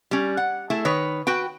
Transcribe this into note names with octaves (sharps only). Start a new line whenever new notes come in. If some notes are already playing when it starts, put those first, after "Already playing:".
G3 C#4
F#5
A3 E4 G#4
D#3 B4 C#5
F#4 B4 G5